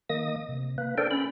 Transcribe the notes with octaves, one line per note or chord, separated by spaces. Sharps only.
D#3 A#3 D#5 D#6
C3
A#3 B4
D4 A4 A#4 C5 D5 G5
C#4 B5